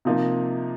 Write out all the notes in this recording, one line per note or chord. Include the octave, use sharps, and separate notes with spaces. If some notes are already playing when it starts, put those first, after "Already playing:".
C3 F3 A#3 D#4